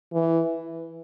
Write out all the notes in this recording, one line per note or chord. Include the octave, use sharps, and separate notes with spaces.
E3